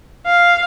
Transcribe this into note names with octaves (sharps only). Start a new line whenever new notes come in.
F5